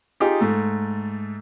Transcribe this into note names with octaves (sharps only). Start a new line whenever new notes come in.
D#4 F4 G4 G#4
G#2 A3